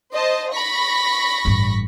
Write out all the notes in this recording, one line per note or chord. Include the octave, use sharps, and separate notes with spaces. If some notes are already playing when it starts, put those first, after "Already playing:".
C5 D#5 A5
B5 C#6 A#6
A1 G2